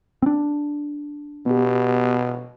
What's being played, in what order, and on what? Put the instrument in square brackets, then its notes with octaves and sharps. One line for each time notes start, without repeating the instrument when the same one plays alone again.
[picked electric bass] C4 D4
[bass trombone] B2 [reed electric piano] B3 G4